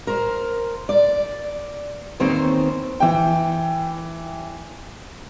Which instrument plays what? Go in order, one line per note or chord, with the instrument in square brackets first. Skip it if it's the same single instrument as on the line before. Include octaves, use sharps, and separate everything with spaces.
[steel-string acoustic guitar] A#4 C5
D5
E2 D#3 A#3 C4 C5 C#5
[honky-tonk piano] E3 G5